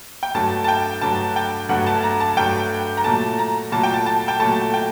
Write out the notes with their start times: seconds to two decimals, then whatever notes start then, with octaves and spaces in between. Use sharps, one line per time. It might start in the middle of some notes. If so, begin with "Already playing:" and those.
0.23 G5
0.34 G2 F#3 A3 A5
0.64 A5
0.68 G5
1.01 G2 F#3 A3 A5
1.36 G5
1.69 G2 F#3 A3 F#5
1.87 A5
2.04 A#5
2.20 A5
2.37 G2 F#3 A3 G5
2.97 A#5
3.04 A#2 F#3 A3 A5
3.39 A#5
3.72 A#2 F#3 A3 A5
3.83 G5
3.94 A5
4.06 A5
4.28 G5
4.39 A#2 F#3 A3 A5
4.74 G5